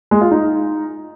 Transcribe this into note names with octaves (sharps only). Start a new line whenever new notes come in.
G#3
F4
D#4